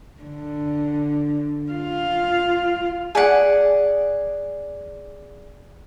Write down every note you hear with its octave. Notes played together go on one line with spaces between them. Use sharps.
D3
F4 F5
G#4 D5 F#5